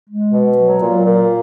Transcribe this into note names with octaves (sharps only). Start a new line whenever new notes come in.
G#3
B2
F#3
A#2
A#2